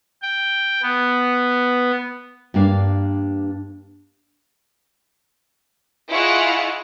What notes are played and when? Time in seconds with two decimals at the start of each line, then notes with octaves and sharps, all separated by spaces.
0.22 G5
0.82 B3
2.54 G2 A#3 D4 F5
6.10 E4 F4 G#4 D#5 F#5 C#6